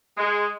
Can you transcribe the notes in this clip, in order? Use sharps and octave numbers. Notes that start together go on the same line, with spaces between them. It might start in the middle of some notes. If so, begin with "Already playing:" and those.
G#3